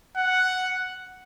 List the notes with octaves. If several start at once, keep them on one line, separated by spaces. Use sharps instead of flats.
F#5